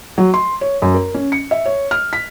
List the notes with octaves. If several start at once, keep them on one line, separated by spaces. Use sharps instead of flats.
F#3
C6
C#5
F#2
A#4
C#4
C#7
E5
C#5
F6
B6